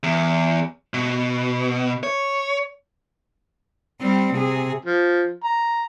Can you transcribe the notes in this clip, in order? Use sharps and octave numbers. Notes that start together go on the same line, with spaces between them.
E2
B2
C#5
G3 C4
C3 G#4
F3
A#5